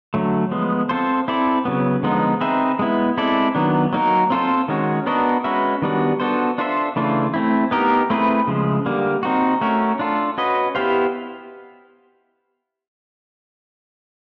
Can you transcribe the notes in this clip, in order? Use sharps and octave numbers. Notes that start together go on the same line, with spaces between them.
D3 F#3 A3
F3 G#3 B3
C4 F4 A4 C5
C4 E4 A4 D5
C#3 F#3 B3
D3 F3 G#3 B3 D#4
C4 D#4 G#4 B4 E5
G#3 B3 E4
G#3 C4 E4 A4 D5
D#3 F#3 B3 D4
F#3 A#3 D#4 F#4 A#4
C4 F4 A4 C5
D#3 G#3 C#4 F#4
B3 D4 F#4 A#4 D#5
G#3 C#4 F#4 B4 E5
D#3 G3 B3 D4 F#4
B3 D4 F#4 A4 C5
D4 F4 A4 C5 E5
C#3 E3 A3 D4 F4
A3 C4 E4
B3 D#4 G4 A#4 D#5
A3 C4 E4 G#4 B4
C#3 F3 G#3
D3 G3 A#3
C4 D#4 F#4
A3 C#4 F#4 A#4
D4 F4 A4
C#4 F#4 B4 D#5
B3 E4 G4 C5 F5